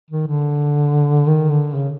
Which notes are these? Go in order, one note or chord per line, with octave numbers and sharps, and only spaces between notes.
D#3
D3
D#3
D3
C#3